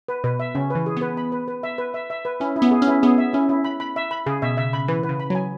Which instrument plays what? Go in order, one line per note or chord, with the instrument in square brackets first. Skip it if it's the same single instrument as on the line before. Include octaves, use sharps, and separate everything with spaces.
[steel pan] B4
[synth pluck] B2 [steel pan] B4
[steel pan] E5
[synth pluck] C#3 [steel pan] C#4
[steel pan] B4
[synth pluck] E3
[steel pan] G#4
[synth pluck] B3 [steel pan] B4
[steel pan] B5
B4
B4
E5
B4
E5
E5
B4
[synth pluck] C#4 [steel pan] E4
[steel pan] E4
[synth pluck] B3
[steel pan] G#4
[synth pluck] C#4
[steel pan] E4
[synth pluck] B3 [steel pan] G#4
[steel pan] E5
[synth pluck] C#4 [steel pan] E4
[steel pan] E4
B5
B5
E5
B5
[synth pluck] C#3 [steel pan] G#4
[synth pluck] B2 [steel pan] E5
[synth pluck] C#3 [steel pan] E5
[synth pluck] C#3 [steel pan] B5
[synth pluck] E3 [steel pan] B4
[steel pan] B4
[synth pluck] C#3
[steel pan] B5
[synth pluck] F#3
[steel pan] G#5